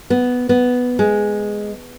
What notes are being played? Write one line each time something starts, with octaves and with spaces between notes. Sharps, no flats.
B3
B3
G#3